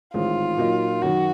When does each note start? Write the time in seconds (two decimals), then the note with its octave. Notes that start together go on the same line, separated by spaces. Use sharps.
0.14 A1 G#2 D#3 G#3 C4 F4
0.58 A#2 F#3 A#3 D#4
1.02 F#2 D#3 F#3 F#4